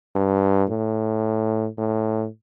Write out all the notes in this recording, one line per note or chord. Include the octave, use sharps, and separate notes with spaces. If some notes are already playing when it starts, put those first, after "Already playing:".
G2
A2
A2